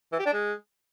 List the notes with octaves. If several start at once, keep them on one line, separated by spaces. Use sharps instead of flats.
E3
G4
D4
G#3